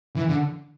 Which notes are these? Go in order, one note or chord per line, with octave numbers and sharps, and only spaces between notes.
E3
D3